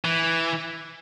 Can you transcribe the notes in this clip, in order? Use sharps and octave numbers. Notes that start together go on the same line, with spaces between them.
E3